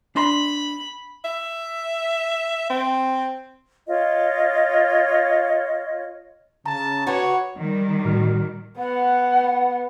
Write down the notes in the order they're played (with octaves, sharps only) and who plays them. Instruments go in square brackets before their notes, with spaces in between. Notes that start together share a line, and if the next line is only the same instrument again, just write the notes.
[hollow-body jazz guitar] D4 C6 [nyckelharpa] B5
[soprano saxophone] E5
C4
[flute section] F4 C#5 D#5
[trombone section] C#3 [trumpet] A5 [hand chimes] A#5
[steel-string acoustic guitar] F#4 B4 D5 [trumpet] C#5
[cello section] D#3 G3
[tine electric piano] A2 F#4 F6
[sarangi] B3 [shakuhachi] F#5